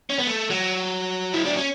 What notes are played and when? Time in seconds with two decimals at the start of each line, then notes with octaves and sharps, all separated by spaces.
0.10 C#4
0.19 B3
0.27 A3
0.50 F#3
1.33 E4
1.45 D4
1.56 C#4